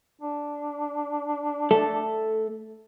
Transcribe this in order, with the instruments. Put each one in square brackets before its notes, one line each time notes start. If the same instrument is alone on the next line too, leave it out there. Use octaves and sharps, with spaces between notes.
[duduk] D4
[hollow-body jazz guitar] A3 A4